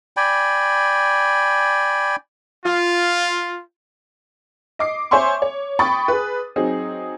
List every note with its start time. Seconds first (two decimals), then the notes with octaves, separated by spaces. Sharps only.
0.17 D5 G5 G#5 B5
2.66 F4
4.79 D#5 D6 C7
5.11 C5 C#5 E5 G#5 C6 C#6
5.42 C#5
5.79 G5 B5 C#6 D#6 A6
6.08 G#4 B4
6.56 F#3 C4 D#4 G#4